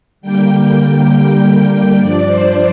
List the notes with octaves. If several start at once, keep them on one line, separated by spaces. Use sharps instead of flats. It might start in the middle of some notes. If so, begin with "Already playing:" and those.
D3 G3 A#3 G5
G2 F3 D4 D5
C5